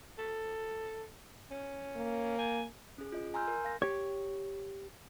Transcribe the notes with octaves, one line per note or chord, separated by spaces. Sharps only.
A4
C#4
A#3
G#5
C#4 G#4
F4 D#5
G#5 A#5 C6 E6 F6 G6
A#4
F5 A#6
G4 C#5